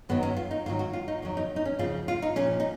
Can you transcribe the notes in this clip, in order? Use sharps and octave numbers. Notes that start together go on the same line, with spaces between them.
F#2 D#3 F#3 B3
C#4
F4
D#4
G#2 D#3 F#3 F4
F#4
F4
D#4
F2 D#3 F#3
D#4
D#4
C#4
F2 C#3 F3 F4
F4
D#4
A#2 F3 C#4
D#4